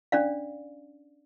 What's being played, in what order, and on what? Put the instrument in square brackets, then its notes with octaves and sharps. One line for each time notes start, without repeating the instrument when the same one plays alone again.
[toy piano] C#4 D4 D5 F5